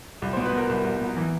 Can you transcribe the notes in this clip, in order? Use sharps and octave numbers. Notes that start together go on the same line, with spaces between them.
C2
B2 C5
B4
B2 A#4
C2
C2
B2
E3